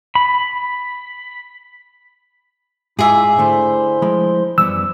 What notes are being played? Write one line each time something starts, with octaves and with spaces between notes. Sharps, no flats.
B5
G#2 E4 F4 G#4 E5 D6
D3 A3 E4 C5 C6
F3 G#3 B5
F#2 E3 F3 G3 B3 E6